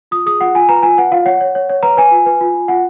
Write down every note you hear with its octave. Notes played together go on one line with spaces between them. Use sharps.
F4 D#6
G#4 D#6
F4 F#5
F4 G#5
B4 A#5
F4 G#5
B4 F#5
F4 F5
C#5 F#5
C#5
C#5
C#5
B4 A#5
B4 G#5
F4
B4
F4
F4
F4 F#5